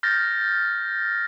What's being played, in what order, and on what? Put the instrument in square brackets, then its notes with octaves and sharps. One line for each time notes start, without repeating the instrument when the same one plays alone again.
[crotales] F6 G6 A6 A#6